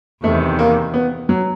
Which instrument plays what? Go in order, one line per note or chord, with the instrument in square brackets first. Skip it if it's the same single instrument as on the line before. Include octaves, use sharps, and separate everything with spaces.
[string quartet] E2 C3 D#3 [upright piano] A3
[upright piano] A#3
B3
F#3